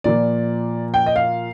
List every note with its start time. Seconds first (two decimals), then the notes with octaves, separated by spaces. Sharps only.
0.04 A#2 F3 D5
0.94 G5
1.06 D#5
1.16 F5